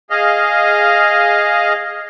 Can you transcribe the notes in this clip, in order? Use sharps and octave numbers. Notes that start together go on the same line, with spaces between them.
G#4 D#5 F5